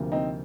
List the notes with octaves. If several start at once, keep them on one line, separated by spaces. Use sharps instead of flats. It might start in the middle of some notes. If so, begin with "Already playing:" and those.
Already playing: D2 C3 F3 A#3
C4 D#4